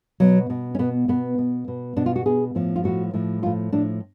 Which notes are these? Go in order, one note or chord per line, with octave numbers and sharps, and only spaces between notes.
B2 F#3
B2
C#4
B2 B3
B2 B3
B2
B2
B2 D4
F4
F#4
B2 G#4
A2 F3
F4
A2 F3 F#4
A2 F3
A2 F3 F4
A2 F3 D4